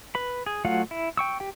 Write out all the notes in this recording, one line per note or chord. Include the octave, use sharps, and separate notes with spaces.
B4 B5
G#4
F#3 A3 F4 F5 F#5
E4
G5 C#6 E6
G4 G5